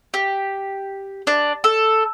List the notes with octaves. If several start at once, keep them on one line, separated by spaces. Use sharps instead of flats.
G4
D4
A4